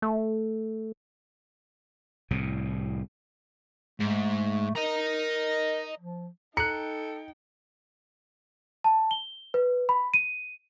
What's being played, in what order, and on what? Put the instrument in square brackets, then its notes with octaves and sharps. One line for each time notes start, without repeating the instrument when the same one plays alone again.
[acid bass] A3
[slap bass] C2 A2 C3
[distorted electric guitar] G#2 [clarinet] A3
[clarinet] A#4 [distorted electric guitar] D#5 A#5
[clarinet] F3
[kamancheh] D#4 G5 [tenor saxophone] A4 [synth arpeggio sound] A#5 F#6 [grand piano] C#7
[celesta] A5
G7
B4
B5
D#7